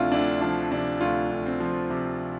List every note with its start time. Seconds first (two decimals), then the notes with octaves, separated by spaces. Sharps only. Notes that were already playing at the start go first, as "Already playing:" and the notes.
Already playing: D2 C3 F3 C4 D4 E4 F4
0.12 D2 D4
0.41 F3 D4
0.72 C3 D4
1.01 D2 F4
1.31 D2
1.46 C4
1.60 F3
1.90 C3